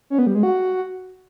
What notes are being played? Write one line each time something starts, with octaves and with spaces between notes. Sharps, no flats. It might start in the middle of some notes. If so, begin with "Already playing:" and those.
C#4
B3
G3
G#3
F#4